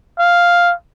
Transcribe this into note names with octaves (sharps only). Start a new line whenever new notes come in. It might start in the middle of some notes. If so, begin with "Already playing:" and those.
F5